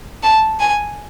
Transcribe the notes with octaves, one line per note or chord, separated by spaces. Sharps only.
A5
G#5